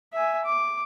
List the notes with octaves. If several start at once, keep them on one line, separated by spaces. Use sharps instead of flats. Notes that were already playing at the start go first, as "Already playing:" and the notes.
E5 G#5
D6